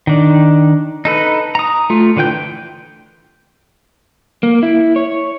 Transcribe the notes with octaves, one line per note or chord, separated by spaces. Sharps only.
D#3 D4
D#4 A4 B4
A#5 D#6
A3 F4
D3 E3 B4 G5 G6
A#3
E4
C#5